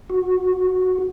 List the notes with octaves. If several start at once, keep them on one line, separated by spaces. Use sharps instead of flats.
F#4